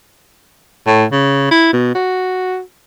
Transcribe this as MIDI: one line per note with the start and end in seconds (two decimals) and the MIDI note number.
0.87 1.04 45
1.12 1.48 49
1.51 1.69 64
1.73 1.93 47
1.95 2.60 66